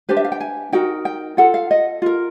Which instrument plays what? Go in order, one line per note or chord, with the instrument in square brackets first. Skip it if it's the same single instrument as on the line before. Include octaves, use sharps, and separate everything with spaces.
[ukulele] D4 G4 B4 C5
E5
F5
G5
G#5
D#4 F#4 A#4 G5
G5
F4 A4 F#5
F5
D#5
F4 A#4